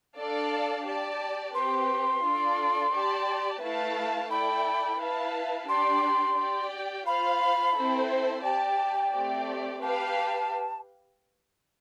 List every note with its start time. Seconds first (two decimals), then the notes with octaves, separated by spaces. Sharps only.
0.17 D4 A4 D5 F5 A5
0.86 G4 D5 A5
1.54 C4 G4 B4 C6
2.24 D4 F4 A4 D5
2.93 G4 D5 A5
3.61 A3 E4 B4 F5 A5
4.30 E4 A4 D5 G5 B5
4.99 E4 B4 F5 A5
5.68 D4 G4 D5 C6
6.37 G4 D5 G5
7.06 F4 C5 F5 B5
7.76 C4 E4 A4 C5
8.44 G4 D5 G5 A5
9.12 A3 C4 G4 D5
9.82 G4 B4 F5 A5